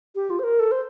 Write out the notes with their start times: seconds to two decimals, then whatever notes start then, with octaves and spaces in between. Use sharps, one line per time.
0.15 G4
0.30 F4
0.39 C5
0.44 A#4
0.59 A4
0.72 C5